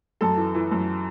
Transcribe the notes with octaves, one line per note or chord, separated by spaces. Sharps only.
F#2 A4
E3
E3
F#2